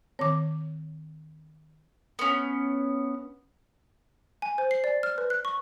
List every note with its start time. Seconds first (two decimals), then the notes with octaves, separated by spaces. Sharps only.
0.19 D#3 C4 C#5 D6
2.19 B3 C#4
4.42 G#5
4.58 C5
4.71 C7
4.84 D5
5.03 F6
5.18 B4
5.30 F#6
5.45 C#6